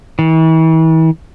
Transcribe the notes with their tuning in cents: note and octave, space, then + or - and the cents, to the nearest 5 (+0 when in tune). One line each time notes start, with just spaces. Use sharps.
E3 -40